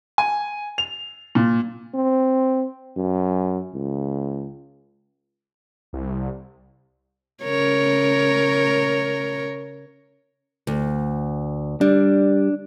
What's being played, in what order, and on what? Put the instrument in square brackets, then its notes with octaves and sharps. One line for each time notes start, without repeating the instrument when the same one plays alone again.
[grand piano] G#5
F7
A#2
[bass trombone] C4
F#2
C#2
[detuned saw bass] C2
[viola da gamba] C#3 A#4 C#5
[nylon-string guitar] D2
[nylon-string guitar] G3 [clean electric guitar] D4